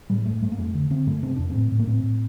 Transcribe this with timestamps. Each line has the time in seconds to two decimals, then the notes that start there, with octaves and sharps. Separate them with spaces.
0.10 A2 G3
0.26 G2 A3
0.42 G2 A3
0.52 A#3
0.58 F2 A3
0.75 D3
0.90 D3 C4
1.07 G2 A3
1.23 C3 C4
1.36 F2 D4
1.50 C4
1.55 A2
1.72 A2
1.79 A#3
1.87 A2 C4
2.04 A2